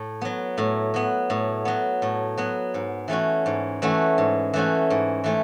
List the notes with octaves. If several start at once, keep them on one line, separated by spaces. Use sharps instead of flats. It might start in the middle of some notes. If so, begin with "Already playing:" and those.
Already playing: A2
F#3 B3
A2
F#3 B3
A2
F#3 B3
A2
F#3 B3
G#2
E3 A3 C#4 F#4
G#2
E3 A3 C#4 F#4
G#2
E3 A3 C#4 F#4
G#2
E3 A3 C#4